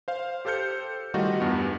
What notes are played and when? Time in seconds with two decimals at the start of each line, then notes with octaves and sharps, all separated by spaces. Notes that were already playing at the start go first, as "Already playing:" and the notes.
0.08 C5 F5
0.45 G4 A4 C5 F6 G6 C#7
1.14 D#3 G3 A3 D#4 F4 F#4
1.40 E2 G2 B3